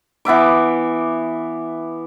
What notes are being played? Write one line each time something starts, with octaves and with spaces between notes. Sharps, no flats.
E3 B3 E5 D6